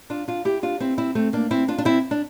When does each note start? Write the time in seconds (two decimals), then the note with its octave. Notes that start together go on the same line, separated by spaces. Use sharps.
0.10 D4 F4
0.28 D4 F4
0.45 E4 G4
0.63 D4 F4
0.80 C4 E4
0.98 C4 E4
1.15 A3 C4
1.33 A#3 D4
1.51 C4 E4
1.68 D4 F4
1.78 D4
1.85 C4 E4
2.11 D4